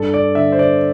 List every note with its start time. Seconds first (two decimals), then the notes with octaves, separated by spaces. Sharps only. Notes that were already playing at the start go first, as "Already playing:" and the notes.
Already playing: G2 A4
0.14 D5
0.35 D3 E5
0.52 C5
0.59 D5